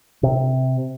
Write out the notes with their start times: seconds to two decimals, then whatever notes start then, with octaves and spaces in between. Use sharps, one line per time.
0.23 C3